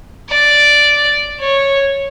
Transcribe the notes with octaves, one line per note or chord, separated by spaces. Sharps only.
D5
C#5